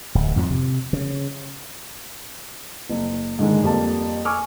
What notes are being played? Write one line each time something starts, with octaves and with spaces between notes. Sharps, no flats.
D1
F2 G#2 D3 F3
C3
C#3
F#1
G#2 D3 D#3 G#3
F2 G3 A#3 A5
G#5 C#6 D6 E6 F6